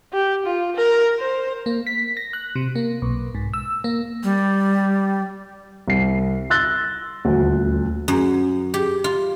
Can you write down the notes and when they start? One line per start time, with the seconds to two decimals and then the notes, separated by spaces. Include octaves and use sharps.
0.13 G4
0.46 F4
0.76 A#4
1.20 C5
1.66 A#3
1.87 B6
2.17 A#6
2.33 F#6
2.56 C3
2.76 A#3
3.02 B1
3.35 G#2
3.54 E6
3.84 A#3
4.24 G3
5.88 C2 C7
6.50 C6 E6 F#6 A6 A#6 G7
7.25 D#1 D2
8.08 F#2
8.74 G4
9.04 F4